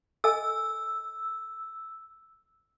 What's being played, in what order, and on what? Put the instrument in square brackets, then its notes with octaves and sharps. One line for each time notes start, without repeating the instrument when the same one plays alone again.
[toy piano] A4 D#5 G#5 [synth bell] E6